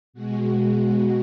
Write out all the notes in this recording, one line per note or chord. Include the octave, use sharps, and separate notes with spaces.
B2 G#3 F#4